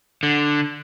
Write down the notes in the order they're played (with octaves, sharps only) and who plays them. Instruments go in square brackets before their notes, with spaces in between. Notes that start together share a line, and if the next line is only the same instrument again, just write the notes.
[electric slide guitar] D3